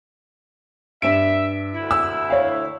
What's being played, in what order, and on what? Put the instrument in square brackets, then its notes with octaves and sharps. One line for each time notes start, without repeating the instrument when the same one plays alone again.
[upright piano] G2 D7 [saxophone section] E5
[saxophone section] D2 E4
[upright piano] E6
C#5 F5